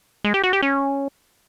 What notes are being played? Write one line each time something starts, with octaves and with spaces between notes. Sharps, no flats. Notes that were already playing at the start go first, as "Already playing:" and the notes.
G#3
G4
F#4
G4
C#4